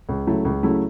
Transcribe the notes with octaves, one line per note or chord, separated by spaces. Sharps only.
C#2
C#3 F#3 A3 E4
C#2
C#3 F#3 A3 E4